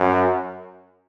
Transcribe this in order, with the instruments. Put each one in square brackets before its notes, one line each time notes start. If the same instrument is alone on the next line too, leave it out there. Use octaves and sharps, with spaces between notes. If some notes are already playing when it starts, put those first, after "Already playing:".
Already playing: [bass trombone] F#2